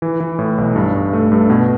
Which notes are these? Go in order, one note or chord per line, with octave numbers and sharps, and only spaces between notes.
E3
E3
A2
B1
G2
G2
A3
G2
B2